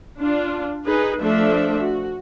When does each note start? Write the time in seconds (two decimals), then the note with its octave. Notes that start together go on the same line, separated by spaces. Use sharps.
0.18 D4 F4
0.86 D#4 G#4 B4
1.20 F3 A3 D4 A4 E5
1.81 F#4